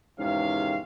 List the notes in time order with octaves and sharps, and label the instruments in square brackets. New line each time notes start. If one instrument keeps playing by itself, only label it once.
[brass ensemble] E2 G#2 C3 D#3 C#4 F5